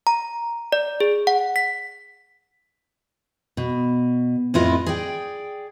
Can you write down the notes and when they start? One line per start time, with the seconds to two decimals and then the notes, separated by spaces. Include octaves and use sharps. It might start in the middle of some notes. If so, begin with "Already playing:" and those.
0.07 A#5
0.72 D5
1.00 G#4
1.27 F#5
1.56 B6
3.57 B2
4.54 F2 A2 E4 F4 B4 D#5
4.86 G#4 D5 G5